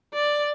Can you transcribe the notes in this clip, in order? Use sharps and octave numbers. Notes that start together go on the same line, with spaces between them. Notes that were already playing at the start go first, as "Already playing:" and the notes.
D5